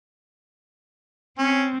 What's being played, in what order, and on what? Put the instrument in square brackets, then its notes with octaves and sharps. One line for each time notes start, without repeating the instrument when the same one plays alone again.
[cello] C4 [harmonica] C#4